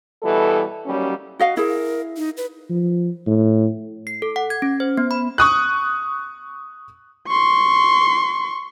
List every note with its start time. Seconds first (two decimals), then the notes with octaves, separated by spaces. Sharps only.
0.23 B2 E3 G3 A4
0.86 D#2 F#3 G3 C#4
1.39 F#4 D#5 F5
1.57 E4 G#4 A#4
2.17 D#4
2.37 B4
2.70 F3
3.27 A2
4.07 C7
4.22 A4
4.36 F#5
4.50 G#6
4.62 C#4
4.80 C5
4.97 B3
5.11 B5
5.38 C#6 D#6 F#6
7.28 C6 C#6